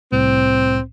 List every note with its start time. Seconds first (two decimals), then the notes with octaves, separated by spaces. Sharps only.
0.12 C2 A2 C4